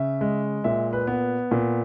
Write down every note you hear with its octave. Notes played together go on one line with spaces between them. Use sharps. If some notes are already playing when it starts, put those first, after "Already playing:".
Already playing: C#3 E5
G#3
A#2 E5
B4
B3
A#2